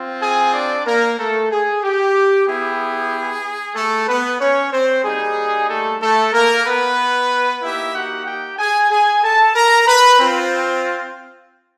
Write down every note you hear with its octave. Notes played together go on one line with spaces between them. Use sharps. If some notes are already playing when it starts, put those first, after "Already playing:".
Already playing: C4 F4
G#4 G#5
D4 D5
A#3 A#4
A3 A4
G#4
G4
B3 E4 G4 G#4
A3 A4
B3 B4
C#4 C#5
C4 C5
G3 A#3 D#4 G#4
A3 A4
A3 A4
A#3 A#4
B3 B4
A#3 D#4 E4 G4 E5
F#4 F#5
G4 G5
G#4 G#5
G#4 G#5
A4 A5
A#4 A#5
B4 B5
C4 F4